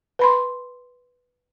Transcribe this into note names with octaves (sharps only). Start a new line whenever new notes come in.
B4 B5 C6